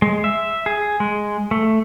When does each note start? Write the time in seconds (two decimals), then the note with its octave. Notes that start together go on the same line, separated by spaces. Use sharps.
0.02 G#3
0.24 E5
0.66 G#4
1.00 G#3
1.51 A3